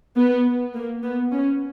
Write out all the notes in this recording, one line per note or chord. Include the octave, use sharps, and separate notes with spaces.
B3
A#3
B3
C#4